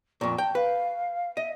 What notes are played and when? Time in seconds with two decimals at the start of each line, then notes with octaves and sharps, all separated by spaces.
0.21 F2 A#2 C#6
0.38 G5 A5
0.55 B4 F5
1.37 D#5 E5